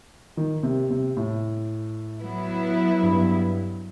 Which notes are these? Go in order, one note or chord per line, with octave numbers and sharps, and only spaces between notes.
D#3
C3
C3
A2
F#3 B3 E4
G2